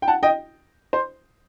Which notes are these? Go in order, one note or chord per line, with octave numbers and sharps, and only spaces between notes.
G5
F#5 A5
D#5 G5
C5